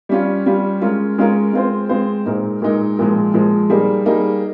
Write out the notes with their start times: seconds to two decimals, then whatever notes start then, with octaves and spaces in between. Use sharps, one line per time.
0.09 G3 C#4 F4
0.46 G3 C#4 F4
0.81 G#3 C#4 F4 A#4
1.18 G#3 C#4 F4 A#4
1.53 G#3 C4 F4 C5
1.89 G#3 C4 F4 C5
2.26 A#2 G#3 D#4 A#4
2.62 A#2 G#3 D#4 A#4
2.99 A#2 F3 G#3
3.34 A#2 F3 G#3
3.70 G3 A#3 D#4 G#4
4.06 G3 A#3 D#4 G#4